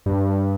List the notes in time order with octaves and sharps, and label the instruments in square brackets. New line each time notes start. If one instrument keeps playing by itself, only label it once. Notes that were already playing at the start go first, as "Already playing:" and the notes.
[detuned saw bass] G2